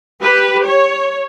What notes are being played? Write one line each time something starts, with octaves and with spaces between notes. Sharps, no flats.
G4 B4
C#5